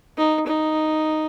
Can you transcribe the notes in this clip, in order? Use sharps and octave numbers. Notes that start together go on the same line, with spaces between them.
D#4
D#4